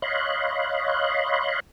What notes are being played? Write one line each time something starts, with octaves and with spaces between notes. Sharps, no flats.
C#5 D#5 F5 B5 C6 F#6